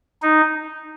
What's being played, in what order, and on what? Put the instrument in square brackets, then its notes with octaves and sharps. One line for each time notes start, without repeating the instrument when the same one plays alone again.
[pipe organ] D#4